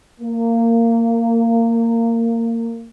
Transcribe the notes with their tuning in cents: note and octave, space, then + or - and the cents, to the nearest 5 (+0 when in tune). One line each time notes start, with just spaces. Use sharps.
A#3 -20